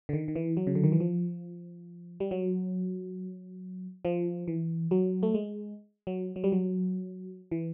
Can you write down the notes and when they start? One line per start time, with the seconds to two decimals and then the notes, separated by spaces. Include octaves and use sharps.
0.09 D3
0.13 D#3
0.28 D#3
0.36 E3
0.57 F#3
0.67 C#3
0.75 D3
0.84 D#3
0.92 E3
1.00 F3
2.20 G3
2.31 F#3
4.05 F3
4.48 E3
4.91 F#3
5.23 A3
5.34 G#3
6.07 F#3
6.36 F#3
6.44 G3
6.52 F#3
7.51 E3